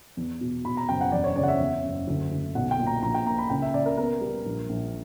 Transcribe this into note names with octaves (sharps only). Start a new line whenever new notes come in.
E2
B2
B2 B5
A#5
F#1 G5
F#5
E1 D5
C#5
C#3 D5
F#5
E5
E2
F#1
D2
D2
B1 F#5
G5
A#2
A#5
A#1 A#5
G5
A#3 A#5
B5
C#2 G5
E5
C#2 D5
A#4
B3 A#4
G3
A#1
A#1